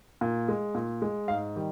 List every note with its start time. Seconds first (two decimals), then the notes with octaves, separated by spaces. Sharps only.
0.21 A#2
0.48 G#3
0.75 A#2
1.02 G#3
1.28 G#2 F5
1.56 D#3 G3